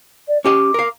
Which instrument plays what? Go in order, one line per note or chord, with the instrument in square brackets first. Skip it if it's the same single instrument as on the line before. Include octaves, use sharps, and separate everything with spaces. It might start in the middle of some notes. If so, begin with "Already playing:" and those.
[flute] D5
[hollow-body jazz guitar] C#4 G4 D#5 [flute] D6
[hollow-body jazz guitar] A#4 F5